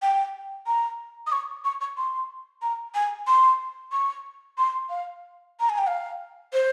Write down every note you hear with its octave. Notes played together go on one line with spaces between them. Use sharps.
G5
A#5
D#6
C#6
C#6
C#6
C6
A#5
G#5
C6
C#6
C6
F5
A#5
G#5
G5
F5
C5